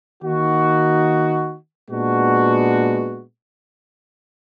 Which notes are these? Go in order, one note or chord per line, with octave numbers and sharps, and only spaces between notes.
D#3 A#3 D#4 F#4
A#2 G#3 B3 D4 F#4